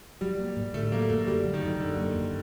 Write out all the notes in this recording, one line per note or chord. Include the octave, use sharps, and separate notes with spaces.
F#3 G3
A#3
A2
D3 A3
F#3 A#3
F#2 A3
D3 G3
F#3
D#3
F#2
D3 F#3
A#3
F#2